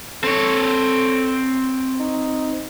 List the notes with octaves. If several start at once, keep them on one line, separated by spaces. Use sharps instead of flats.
C4 A4 C#5
D#4